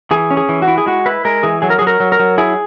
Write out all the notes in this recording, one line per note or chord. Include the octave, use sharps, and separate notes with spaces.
E3 G#4
C#4
G#4
E3
F#4
E4
G#4
G#3 F#4
E4 B4
G#3 A#4
E3 G#4
F#3 G#4
A#4
F#3 G#4
A#4
F#3
A#4
F#3
E4 G#4